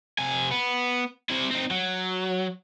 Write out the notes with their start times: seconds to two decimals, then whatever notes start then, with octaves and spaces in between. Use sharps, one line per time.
0.18 C3 G#5
0.51 B3
1.30 C3 E4
1.51 C4 D#4
1.71 F#3